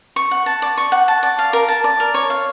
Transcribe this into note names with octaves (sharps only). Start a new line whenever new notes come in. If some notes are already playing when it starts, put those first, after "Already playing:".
C#6
F#5
A5
D5
C#6
F#5
A5
D5
F5
A#4
A5
D5
A#4
C#5
F5